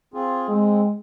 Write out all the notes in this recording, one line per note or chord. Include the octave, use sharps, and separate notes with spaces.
C4 F4 G#4
G#3 C4